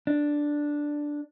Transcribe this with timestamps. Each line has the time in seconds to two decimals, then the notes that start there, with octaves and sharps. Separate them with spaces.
0.07 D4